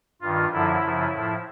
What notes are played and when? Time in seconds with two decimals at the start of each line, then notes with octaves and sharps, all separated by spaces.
0.21 G2 D#3 F4
0.52 F#2 D3 F3 E4
0.83 F#2 C#3 F3
1.12 A2 F3